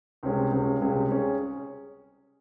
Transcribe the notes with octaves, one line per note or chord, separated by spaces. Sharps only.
C#2 C3 G3 C#4 G#4
C#2 C3 G3 C#4 G#4
C#2 C3 G3 C#4 G#4
C#4 G#4